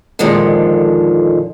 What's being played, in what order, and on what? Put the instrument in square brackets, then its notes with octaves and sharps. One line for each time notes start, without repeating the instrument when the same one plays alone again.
[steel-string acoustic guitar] F2 A#2 D3 D#3 F3 G#3